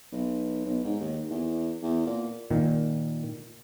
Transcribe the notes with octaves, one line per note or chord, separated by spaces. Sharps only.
B1
B1
G#2
D#2
E2
E2
A#2
A#2 D#3